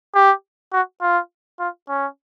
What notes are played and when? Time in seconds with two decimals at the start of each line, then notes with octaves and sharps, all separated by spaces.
0.15 G4
0.73 F#4
1.01 F4
1.60 F4
1.89 C#4